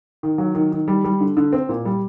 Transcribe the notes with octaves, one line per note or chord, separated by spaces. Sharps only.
D#3
F#3
D#3
D#3
G3
G3
D3
D3
C4
A#2
G3